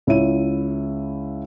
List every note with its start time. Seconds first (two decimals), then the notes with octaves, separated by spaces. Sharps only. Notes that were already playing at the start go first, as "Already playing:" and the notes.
0.07 C#2 E4 C#5 E5 D#7